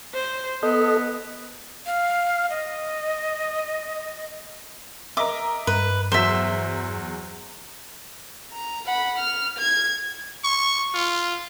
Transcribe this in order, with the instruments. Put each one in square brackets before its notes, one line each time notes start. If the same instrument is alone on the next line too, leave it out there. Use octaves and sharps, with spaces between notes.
[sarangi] C5
[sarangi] B3 [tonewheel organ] A4 D#5
[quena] F5
D#5
[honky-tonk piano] A#4 D#5 E5 [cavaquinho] D6
[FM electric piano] G2 [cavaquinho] B4
[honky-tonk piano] E2 F#3 [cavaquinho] C5 E5
[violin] A#5
F#5 B5
F6
G#6
[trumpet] C#6
F4